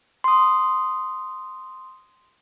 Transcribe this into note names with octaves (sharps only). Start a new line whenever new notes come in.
C6 D#6